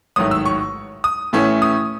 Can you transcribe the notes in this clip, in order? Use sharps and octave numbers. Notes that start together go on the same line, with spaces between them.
A1 G#2 D#3 F#3 A3 D#6
E6
C#6
D#6
A2 E3 A3 C#4 E4
D#6